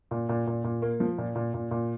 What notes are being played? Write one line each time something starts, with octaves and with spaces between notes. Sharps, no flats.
A#2
A#2
A#2
A#2
A#3
F3
A#2
A#2
A#2
A#2